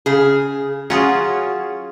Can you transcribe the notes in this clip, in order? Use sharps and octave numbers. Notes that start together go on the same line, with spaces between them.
C#3 G#4
F#3 C#4 F4 F#4 G#4